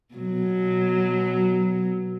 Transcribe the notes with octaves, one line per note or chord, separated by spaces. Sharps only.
B2 F#3